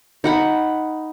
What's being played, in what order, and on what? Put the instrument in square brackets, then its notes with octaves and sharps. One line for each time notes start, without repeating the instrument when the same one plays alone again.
[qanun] D#4 F#5 B5